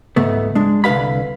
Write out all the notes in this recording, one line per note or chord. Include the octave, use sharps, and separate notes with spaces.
C#2 G#2 A3 B3
G#3 D4
C2 D3 B4 F5 B5